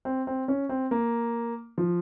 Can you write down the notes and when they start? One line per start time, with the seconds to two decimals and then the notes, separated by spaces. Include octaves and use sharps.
0.05 C4
0.27 C4
0.48 C#4
0.69 C4
0.91 A#3
1.78 F3